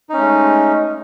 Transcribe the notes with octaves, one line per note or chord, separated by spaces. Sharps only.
G#3 A3 C#4 D#4